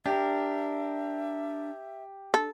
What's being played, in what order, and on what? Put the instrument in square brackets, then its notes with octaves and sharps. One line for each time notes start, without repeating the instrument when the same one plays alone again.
[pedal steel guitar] D4 A#4 [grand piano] G4 [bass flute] E5
[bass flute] D4 [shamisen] A4